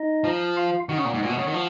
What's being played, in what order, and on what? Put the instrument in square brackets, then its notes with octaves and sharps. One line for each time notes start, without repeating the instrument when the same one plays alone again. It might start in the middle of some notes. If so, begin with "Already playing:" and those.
Already playing: [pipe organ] D#4 D#5
[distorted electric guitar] F3
[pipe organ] F4 F5
[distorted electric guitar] D#3 [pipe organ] F#4 F#5
[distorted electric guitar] C#3
A#2
G#2
A#2
B2
C#3
D#3
F3